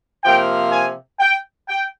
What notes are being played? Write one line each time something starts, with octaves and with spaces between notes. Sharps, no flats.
C3 F3 A#3 G5
G#5
G5
G5